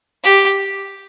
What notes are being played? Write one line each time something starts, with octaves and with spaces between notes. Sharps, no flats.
G4